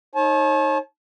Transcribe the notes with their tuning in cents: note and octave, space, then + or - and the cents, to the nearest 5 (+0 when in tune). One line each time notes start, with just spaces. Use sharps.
D#4 +0 C#5 -35 A5 -35